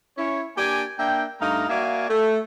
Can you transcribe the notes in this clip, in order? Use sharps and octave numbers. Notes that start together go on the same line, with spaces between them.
C#4 E4 C#5
A#3 D4 G4 D5 G#5
A#3 D4 E5 G5
G2 A3 D#4 F5 A#5
A#3 F#4 D5 E5 F5 G#5
A3